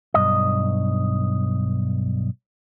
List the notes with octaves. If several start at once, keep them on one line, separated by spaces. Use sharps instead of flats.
B1 G2 D#5